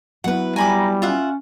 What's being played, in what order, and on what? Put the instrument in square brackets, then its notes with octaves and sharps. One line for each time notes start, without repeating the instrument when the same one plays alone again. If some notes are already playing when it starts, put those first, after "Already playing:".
[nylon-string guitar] F#3 B3 E4 [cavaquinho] B4 F#5
[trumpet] G3 [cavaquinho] G#5 B5 D6 [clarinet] A#5
[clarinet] C#4 [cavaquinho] F4 E5 F#5